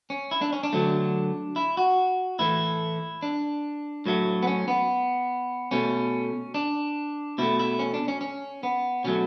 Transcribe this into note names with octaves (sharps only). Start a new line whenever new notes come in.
C#4
E4
D4
C#4
D4
D3 F#3 A3
E4
F#4
A2 E3 A3 E4
D4
A2 F#3 A3
B3
C#4
B3
B2 A3 C#4
D4
B2 A3 E4
E4
C#4
D4
C#4
C#4
B3
B2 F#3 A3 C#4